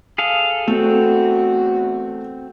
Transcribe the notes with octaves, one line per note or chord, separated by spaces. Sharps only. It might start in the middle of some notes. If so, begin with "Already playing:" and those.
G#4 A4 F5
E2 A3 C4 F#4